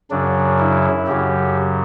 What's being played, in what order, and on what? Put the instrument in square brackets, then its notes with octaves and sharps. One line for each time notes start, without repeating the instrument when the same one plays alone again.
[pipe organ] F#2 C#3 F#3 D4
E4
F#2 C#3 F#3 G4